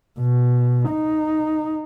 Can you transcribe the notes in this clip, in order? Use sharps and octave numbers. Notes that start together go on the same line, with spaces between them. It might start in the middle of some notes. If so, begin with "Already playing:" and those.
B2
D#4